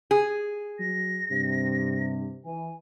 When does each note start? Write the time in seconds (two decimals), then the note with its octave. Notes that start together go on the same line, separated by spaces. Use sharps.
0.11 G#4
0.79 F#3 A#6
1.31 G2 C3
2.45 E3 G#5